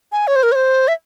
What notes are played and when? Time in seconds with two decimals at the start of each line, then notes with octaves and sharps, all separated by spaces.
0.12 G#5
0.27 C#5
0.36 C5
0.43 A#4
0.52 C#5
0.55 C5
0.88 E5